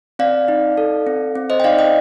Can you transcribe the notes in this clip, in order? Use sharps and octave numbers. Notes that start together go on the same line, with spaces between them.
C4 D5 F5
D#4
A4
C4
C4
C5 D#5
G5
D#4 D5 F5
D#5 G5